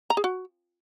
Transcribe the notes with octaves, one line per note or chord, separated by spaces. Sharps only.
A#5
G#4
F#4